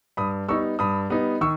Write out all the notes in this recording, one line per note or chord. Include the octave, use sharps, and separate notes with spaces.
G2 B5 D#6
G3 B3 D#4 C#6 E6
G2 B5 D#6
G3 B3 D#4
D#3 C#6 E6